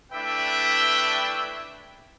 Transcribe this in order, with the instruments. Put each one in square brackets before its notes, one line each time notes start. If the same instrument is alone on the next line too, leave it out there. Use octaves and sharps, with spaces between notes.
[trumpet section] A3 D4 E4 B4 E5 G5